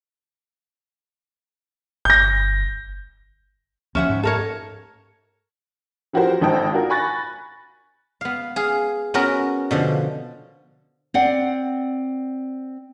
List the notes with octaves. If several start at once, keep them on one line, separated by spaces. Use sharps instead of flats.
G1 G6 A#6
D2 F3 C#4 E5 F#5
G#2
A4 A#4 C#5
E3 F3 F#4 G4 A#4 C5
G#1 D#4 A4 C5 G5
D4 F4 F#4 A#4
G#5 B5 C#6 F#6 A6 A#6
B3 F5
G#4 F5
B3 C#4 F#4 A#4
B2 D3 F3
C4 D5 F#5